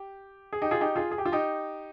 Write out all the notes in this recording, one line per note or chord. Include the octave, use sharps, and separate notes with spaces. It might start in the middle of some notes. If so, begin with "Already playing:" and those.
Already playing: G4
G#4
D#4 G4
F4 G#4
D#4 G4
F4 G#4
G#4
G4
F4
D#4 G4